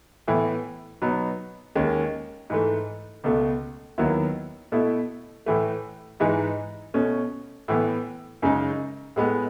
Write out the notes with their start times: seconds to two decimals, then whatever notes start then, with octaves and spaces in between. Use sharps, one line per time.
0.28 A2 E3 B3 E4
1.02 B2 F#3 B3 D#4
1.75 D#2 D#3 G#3 C#4
2.50 G#2 E3 A3
3.24 C#2 B2 A3
3.98 D#2 D#3 F#3 B3 E4
4.72 B2 A3 E4
5.46 A2 E3 A3
6.20 G#2 E3 G#3 D#4
6.94 B2 A3 C#4
7.68 A2 E3 B3
8.42 F#2 C#3 G#3 D#4
9.16 A2 G#3 B3